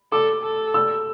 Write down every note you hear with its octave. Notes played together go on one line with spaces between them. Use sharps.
A4 D6
A4
E6